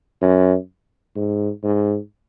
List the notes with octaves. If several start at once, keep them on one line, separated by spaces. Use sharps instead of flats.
F#2
G#2
G#2